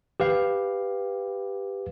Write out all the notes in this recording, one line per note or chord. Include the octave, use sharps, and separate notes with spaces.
G4 B4 F5